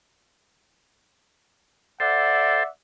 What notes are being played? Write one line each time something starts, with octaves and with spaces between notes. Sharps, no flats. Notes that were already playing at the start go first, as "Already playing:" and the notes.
A4 C5 D5 E5 F#5